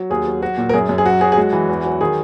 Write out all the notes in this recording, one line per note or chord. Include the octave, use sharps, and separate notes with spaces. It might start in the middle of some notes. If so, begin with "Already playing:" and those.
Already playing: F#3
D#2 G#4
F#3
F#3 F#4
A#2
A#4
F#2 G#4
F#2
G#4
F#3 F#4
F#3 G#4
G#4
G#3 F#4
E3
E2
F#3
D#3 G#4